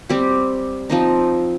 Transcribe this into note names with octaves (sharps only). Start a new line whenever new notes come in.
G3 C4 G4
F3 C4 D#4